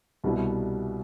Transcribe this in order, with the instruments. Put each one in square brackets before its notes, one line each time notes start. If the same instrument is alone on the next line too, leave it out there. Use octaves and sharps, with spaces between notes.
[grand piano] C2 B2 G3 B3 E4